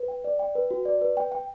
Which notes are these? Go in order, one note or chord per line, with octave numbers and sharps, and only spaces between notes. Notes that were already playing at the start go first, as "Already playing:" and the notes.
Already playing: B4
G5
D5
G5
B4
F#4
D5
B4
G5
G5